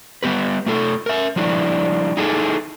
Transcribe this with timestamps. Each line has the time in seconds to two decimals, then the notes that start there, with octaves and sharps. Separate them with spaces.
0.23 G3 B3 G4 B4
0.66 A3 F4 A4
1.06 A#4 E5
1.36 F3 G3 D4 E4
2.17 D#4 E4 G#4 A4